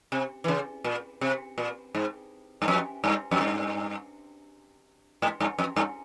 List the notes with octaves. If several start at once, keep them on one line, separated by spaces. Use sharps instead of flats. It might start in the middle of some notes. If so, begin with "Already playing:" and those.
C3
E3
C#3
A#2
C3
A#2
G#2
G2
F2
G2
F2
G2
G#2
G2
F2
G2